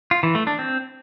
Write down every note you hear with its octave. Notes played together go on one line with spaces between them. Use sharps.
F4
E3
A3
D4
C4